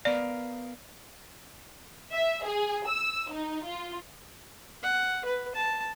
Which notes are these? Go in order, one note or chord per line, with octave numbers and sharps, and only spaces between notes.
B3 A#4 D5 F5
E5
G#4
E6
D#4
F4
F#5
B4
A5